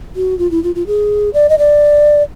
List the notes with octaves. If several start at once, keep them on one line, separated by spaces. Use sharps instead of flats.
F#4
F4
E4
F4
F4
G#4
D5
D#5
D5